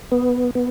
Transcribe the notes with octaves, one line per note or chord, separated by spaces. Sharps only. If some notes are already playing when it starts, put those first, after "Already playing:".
B3
B3